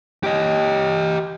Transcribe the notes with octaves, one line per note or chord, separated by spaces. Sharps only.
G4 D#5